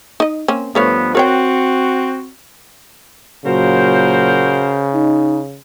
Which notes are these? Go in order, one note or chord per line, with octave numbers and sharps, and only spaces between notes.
D#4 D#5
A#3 C4 C#4
G2 F3 A3 B3 C#5 F5
C4 F#4 A#4 C#5 G5
A#2 C#3 F#3 F#4 A#4 C5
D#4